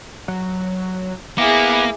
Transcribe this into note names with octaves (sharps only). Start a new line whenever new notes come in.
F#3
A#3 B3 E4 G#4 D6